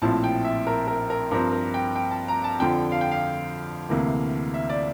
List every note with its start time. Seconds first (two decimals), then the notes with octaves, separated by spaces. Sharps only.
0.02 A#1 A2 F3 C4 E4 A5
0.24 G5
0.44 E5
0.67 A#4
0.87 A#4
1.10 A#4
1.31 G2 F3 C4 A#4
1.53 A#4
1.74 G5
1.96 G5
2.11 A5
2.28 A#5
2.44 A5
2.59 F2 D3 F3 G5
2.92 F5
3.01 G5
3.11 F5
3.89 D2 C3 E3 A#3
4.54 E5
4.69 D5